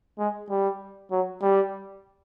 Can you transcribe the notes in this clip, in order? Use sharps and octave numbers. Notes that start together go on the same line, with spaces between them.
G#3
G3
F#3
G3